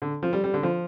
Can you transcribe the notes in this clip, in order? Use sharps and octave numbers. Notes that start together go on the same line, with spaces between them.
D3
F3
G3
G3
D3
F3